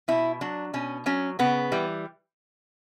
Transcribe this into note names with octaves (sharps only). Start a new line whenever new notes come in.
B2 E4
F#3 D4
B2 C#4
F#3 C#4
C#3 B3
E3 G3